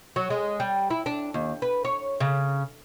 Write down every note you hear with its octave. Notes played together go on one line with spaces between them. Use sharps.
F#3
G#3
G3
E4
D4
D#2
B4
C#5
C#3